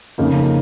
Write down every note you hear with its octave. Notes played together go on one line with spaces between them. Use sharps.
F2 C#3 A#3 D#4